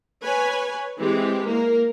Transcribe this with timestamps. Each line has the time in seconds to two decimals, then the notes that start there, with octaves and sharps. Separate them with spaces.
0.23 B4 C#5 G#5
0.98 E3 G#3 C4 G4
1.46 A#3 A#4